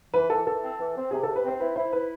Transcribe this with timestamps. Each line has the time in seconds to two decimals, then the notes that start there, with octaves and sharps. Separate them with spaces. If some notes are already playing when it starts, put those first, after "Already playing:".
0.13 E3 B4
0.30 E3 A4
0.46 E3 A4
0.62 C4
0.79 E3
0.96 C4
1.11 C3 G#4
1.23 A4
1.28 C3
1.36 B4
1.43 C4 C5
1.60 E4 B4
1.76 E4 C5
1.93 E4 B4